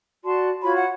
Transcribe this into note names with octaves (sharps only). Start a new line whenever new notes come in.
F#4 D5 A5 C6
F4 F#4 C#5 B5
F#5